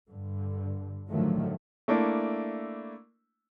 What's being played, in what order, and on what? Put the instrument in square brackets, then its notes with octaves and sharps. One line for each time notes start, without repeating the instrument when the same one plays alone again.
[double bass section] G2 D3
A2 D3 D#3 F3 F#3 A3
[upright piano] A3 A#3 D4 E4